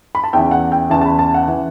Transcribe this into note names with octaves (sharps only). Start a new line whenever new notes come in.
B5
A5
E2 C#3 E3 G5
F#5
G5
E2 C#3 E3 A5
A5
B5
A5
F#5
C#3 E3